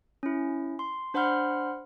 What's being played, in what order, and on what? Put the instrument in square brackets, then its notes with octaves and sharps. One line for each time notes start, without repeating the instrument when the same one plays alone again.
[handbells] C#4 E4
C6
D4 C5 F#5 B5 C6 F6